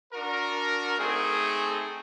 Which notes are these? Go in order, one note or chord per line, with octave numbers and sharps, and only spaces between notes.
D4 F#4 A#4
A3 C4 D#4 G#4